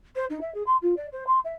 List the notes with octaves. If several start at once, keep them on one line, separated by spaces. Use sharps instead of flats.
C5
D#4
E5
G#4
C6
F4
D5
C5
C6
E5